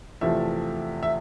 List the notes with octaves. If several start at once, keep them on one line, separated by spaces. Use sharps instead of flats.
E2 C3 F3 A3 E5
E5